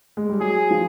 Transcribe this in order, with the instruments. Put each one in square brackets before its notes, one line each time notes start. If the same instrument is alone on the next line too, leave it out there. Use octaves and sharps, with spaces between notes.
[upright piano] G#3
G3
[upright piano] F#3 [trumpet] G#4
[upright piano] F3